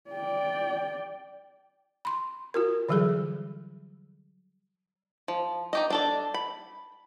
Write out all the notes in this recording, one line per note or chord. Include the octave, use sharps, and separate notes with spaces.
D5 G5
B5 C6
F4 F#4 A#4
D3 E3 F#3 G3 G#4 A4
F3
D#4 G4 D#5
D4 A4 D5
B5